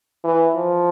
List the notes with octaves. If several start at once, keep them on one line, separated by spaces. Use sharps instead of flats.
E3
F3